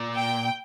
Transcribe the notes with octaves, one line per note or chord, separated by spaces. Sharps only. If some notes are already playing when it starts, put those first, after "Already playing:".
Already playing: A#2
G5